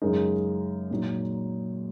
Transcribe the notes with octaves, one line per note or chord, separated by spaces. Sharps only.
F#2 C#3 G#3 D#4 A#4
A#2 F#3 D#4